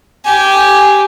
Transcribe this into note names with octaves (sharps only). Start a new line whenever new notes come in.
G4 G#5